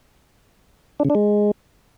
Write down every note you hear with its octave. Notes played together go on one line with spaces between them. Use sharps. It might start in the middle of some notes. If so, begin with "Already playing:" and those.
D4
C#3
D4
G#3